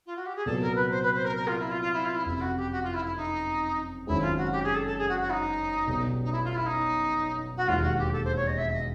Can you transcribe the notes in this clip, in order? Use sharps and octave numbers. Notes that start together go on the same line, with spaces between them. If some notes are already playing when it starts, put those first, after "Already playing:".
F4
F#4
G4
G#4
C2 A#2 F#3 B3 A4
A#4
B4
C5
B4
C5
A#4
A#4
F4
E4
F4
F4
E4
F4
E4
F#1 F2 C3 E4
F#4
G4
F#4
F4
E4
E4
D#4
F#1 F#2 D#3 G#3 C4 E4
F4
F#4
G4
G#4
A4
A4
G#4
F#4
F#4
D#4
B1 B2 G3 B3
D#4
E4
F4
E4
D#4
F#4
E1 D#2 D#3 F4
F#4
G4
A4
C5
C#5
D#5
E5
D#5